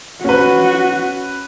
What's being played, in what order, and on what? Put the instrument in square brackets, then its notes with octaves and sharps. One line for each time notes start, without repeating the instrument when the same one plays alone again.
[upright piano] C#4 B4 [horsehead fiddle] F#4